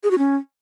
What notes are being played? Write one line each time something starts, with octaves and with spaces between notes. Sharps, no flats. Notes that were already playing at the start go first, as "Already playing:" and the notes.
G#4
F#4
C#4